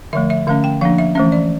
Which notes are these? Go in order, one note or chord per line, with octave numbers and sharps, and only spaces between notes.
D3 F3 A3 E5
E5
D3 A3 C#4 F5
G5
F3 A#3 D4 F5
E5
E3 A3 C#4 E5
D5